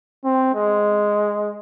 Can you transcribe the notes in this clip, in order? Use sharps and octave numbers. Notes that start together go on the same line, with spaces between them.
C4
G#3